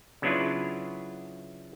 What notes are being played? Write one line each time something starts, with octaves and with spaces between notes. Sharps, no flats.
C#3 F#3 B3 D4 E4 F4